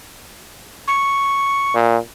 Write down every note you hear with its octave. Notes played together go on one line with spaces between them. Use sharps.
C#6
A#2